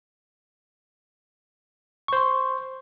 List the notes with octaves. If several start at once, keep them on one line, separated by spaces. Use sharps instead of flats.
C5 C6 C#6